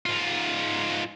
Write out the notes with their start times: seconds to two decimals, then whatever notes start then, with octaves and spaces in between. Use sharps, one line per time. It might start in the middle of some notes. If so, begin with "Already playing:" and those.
0.06 G#2 F4